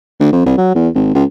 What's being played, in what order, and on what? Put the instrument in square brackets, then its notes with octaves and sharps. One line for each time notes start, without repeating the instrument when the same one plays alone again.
[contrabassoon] D2
F2
C2
F#3
E2
G#1
C#2